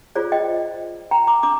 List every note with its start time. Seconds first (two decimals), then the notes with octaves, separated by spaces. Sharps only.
0.16 F4 G#4 C5 D5
0.32 D#5 G5
1.11 G5 A#5
1.27 A#5 D6
1.43 D4 A#5 D6